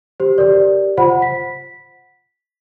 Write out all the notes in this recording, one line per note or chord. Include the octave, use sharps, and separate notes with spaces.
G4 C5
G4 A#4 D5
F4 C5 F#5 B5
B6